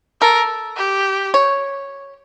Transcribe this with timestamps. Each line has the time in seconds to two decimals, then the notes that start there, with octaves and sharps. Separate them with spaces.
0.21 A4 A#4
0.77 G4
1.34 C#5